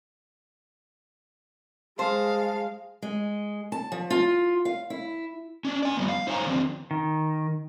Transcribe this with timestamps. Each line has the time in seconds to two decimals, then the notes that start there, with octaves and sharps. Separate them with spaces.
1.99 G#3 C5 F5 A5
3.02 G#3
3.72 A5
3.92 F3
4.10 F4
4.65 F5
4.90 E4
5.65 C#4 D4
5.82 D5 G#5
5.97 F2 C3 G3 B3
6.09 F5
6.27 D#4 C5 C#5 F5 G#5 A#5
6.45 D3 D#3 F3 C4
6.91 D#3